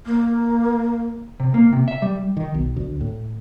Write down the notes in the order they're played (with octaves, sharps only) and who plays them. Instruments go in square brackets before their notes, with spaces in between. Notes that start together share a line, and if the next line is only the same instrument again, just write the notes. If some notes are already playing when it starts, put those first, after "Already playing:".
[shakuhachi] A#3
[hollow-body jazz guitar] C3
A#3
C3
E5
G3
[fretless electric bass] D#3
B1
D2
A2